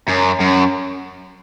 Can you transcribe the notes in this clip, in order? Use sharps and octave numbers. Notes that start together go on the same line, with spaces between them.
F#2
F#2